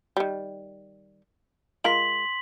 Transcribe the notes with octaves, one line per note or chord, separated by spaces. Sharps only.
D#3 G3
G#3 F4 A#4 C6 B6 F#7